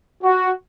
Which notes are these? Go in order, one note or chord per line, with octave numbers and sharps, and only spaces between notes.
F#4